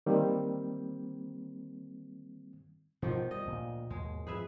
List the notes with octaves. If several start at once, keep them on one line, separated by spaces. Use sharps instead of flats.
D#3 G3 A#3 C4
B2 D#3 F3
G3 D#5
D2 A#2
D#2 G#2 B2 G#3
F2 G#4 B4 E5